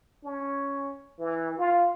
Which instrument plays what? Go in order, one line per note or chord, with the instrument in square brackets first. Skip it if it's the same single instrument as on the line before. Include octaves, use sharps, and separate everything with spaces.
[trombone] C#4
E3
F4